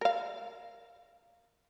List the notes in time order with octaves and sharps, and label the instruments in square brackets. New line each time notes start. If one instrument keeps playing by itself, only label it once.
[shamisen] A#4 F5